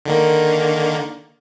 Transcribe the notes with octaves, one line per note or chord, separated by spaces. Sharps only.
D3 D#3 A#3